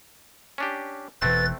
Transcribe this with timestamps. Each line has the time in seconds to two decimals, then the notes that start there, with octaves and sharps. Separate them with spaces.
0.58 C#4 D4 G4
1.22 E1 B2 E3 A3 C4 B4 A6